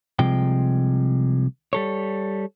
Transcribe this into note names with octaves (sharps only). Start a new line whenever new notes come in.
C2 C3 F3 G#3 G5
G3 A4 C#5